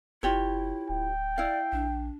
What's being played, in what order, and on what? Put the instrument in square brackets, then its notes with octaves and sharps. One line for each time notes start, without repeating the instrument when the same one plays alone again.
[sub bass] F#1 [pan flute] E4 [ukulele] F4 G4 C#5
[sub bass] D1 [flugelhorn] G5
[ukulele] E4 F5 [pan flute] D5
[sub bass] A#1 [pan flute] D4